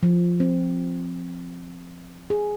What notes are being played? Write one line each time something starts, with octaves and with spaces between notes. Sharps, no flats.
F3
C4
G#4